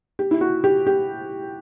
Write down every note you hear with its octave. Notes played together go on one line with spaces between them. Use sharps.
G4
E4
F#4
G4
G4